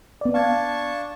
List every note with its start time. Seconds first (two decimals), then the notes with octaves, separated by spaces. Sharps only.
0.21 B3 D5
0.34 D4 F5 A5 C#6 G#6